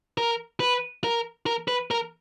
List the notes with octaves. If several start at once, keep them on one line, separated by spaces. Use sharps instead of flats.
A#4
B4
A#4
A#4
B4
A#4